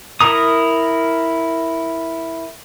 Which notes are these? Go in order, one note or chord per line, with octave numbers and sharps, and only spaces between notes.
E4 A#4 A#5 D#6